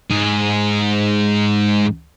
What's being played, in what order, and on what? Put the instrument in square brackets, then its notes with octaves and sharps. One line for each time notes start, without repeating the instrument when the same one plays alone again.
[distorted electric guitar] G#2 G#4